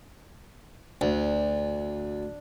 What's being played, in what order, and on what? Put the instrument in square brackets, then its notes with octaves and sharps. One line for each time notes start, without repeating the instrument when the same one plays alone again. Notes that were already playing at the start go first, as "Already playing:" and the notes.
[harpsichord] D2 [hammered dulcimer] D4